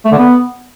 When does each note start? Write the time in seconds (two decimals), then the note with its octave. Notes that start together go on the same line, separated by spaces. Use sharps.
0.05 A3
0.12 D3
0.18 B3